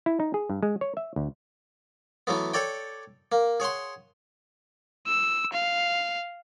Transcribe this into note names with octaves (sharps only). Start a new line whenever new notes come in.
E4
D#4
G#4
G2
G#3
C#5
E5
D2
E3 F#3 A3 B3
A4 C#5 D5 G5
A#3
G#4 C#5 F#5 C6
E6
F5